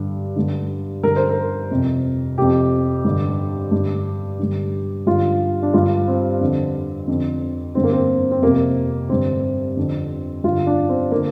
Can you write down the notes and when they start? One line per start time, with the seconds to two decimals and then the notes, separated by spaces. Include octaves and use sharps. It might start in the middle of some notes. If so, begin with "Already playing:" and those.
Already playing: G2 D3
0.36 G2 D3
1.03 G2 D3 A#4
1.16 C5
1.29 A#4
1.71 F2 C3
2.38 F2 C3 G4
3.05 G2 D3
3.71 G2 D3
4.39 G2 D3
5.07 G2 D3 F4
5.62 D4
5.74 G2 D3 F4
6.08 C4
6.41 F2 D3
7.08 F2 D3
7.75 G2 D3 C4
7.84 A#3
7.92 C4
8.31 C4
8.42 F2 C3 A#3
9.09 G2 D3 C4
9.77 F2 D3
10.44 G2 D3 F4
10.67 D4
10.89 C4
11.11 D3 A#3